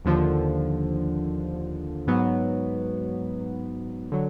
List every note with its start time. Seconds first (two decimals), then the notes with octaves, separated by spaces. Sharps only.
0.05 D#2 D3 F3
2.07 G#2 F#3 B3
4.12 D3 F#3